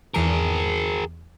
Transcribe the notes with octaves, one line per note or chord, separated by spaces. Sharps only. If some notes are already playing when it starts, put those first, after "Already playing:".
E2 E3 G#4 A#4 F6